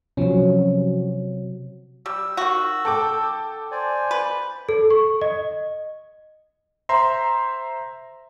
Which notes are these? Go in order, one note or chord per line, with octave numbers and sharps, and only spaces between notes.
C3 F3 F#3 C#4
G3 E6
D#3 F#4
A4 G5 D6
C5 D5 G#5
B4
A4
C#6
D#5
C5 E5 A#5 C6